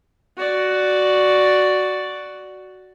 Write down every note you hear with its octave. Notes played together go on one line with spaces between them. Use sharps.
F#4 D5